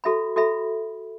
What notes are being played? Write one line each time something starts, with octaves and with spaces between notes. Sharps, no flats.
F#4 A4 E5 B5
F#4 A4 E5 B5